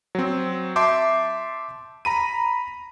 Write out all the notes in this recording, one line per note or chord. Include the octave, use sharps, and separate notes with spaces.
F#3 C4
E5 A5 C6 D6 G6
A#5 B5 D#7